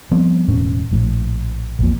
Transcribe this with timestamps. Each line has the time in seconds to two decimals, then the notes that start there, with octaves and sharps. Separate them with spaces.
0.11 F3 G3 B3 C4
0.48 E1 A2 C#4
0.91 A#1 A2
1.79 A#1 E2 A#2